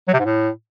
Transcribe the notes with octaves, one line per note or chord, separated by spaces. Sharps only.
F#3
C3
G#2
A2